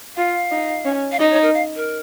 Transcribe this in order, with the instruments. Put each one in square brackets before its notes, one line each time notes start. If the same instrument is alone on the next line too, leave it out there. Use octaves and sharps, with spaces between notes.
[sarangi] F4 [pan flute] F5
[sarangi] D#4
C#4
[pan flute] F5
[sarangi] D#4 [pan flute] D#5
[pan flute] C#5
A#4
F5
A#4